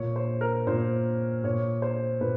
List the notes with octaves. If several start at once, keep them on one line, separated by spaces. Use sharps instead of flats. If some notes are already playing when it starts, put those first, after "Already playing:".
Already playing: A#2 C#5
C5
A#4
A#2 C5
A#2 C#5
C5
A#2 B4